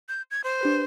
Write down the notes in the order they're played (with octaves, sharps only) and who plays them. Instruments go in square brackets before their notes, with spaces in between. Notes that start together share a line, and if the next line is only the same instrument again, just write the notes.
[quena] G6
G#6
C5
[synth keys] D4 G4 B4